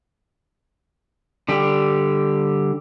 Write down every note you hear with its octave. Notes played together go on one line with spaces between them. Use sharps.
D3 G3 G4